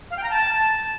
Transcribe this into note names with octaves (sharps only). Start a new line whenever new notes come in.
F5
G5
A#5
A5